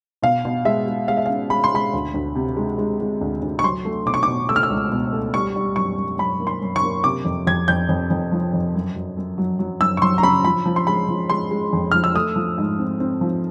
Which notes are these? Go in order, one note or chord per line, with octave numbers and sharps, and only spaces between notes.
B2 F5
B2
G#3 E5
G#3
G#3 F5
E5
C#4 F5
G#3 B5
C6
G#3 B5
D2
D2
C3
G#3
G#3
G#3
D2
D2
C#6
F#3 C6
A3
B2 D6
C#6
B2 D6
A3 E6
F6
E6
C#2
B2
A3
G3 C#6
G3
F#2 C#6
F#2
F#2 B5
A#3
C6
F#2
C#6
A#3
C3 D6
F2
F2 G#6
F2 G6
F2
F2
F3
F2
F#2
F#3
F#2
F#3
F#3
F#2 E6
C#6
F#3 C6
A#5
C#3 B5
F3 B5
F3
C6
G#3 B5
F3
G#3 C6
G#3
F2
F3 F6
E6
A3 D#6
F3
G#2
C4
C4
F3